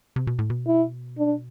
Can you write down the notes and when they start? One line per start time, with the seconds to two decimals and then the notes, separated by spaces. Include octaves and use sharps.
0.16 C3
0.27 B2
0.39 A2
0.50 B2
0.67 E4
1.18 D4